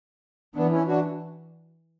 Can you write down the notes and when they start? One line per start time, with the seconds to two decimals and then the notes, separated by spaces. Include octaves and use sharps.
0.55 E3 B3 D4
0.71 C#4 E4
0.88 D4 F#4